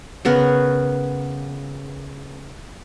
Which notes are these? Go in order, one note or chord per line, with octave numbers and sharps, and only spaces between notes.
C#3 B3 A#4 B4